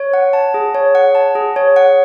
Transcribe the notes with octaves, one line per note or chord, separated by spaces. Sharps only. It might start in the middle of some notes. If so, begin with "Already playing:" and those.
Already playing: C#5
F#5
A5
G#4
C#5
F#5
A5
G#4
C#5
F#5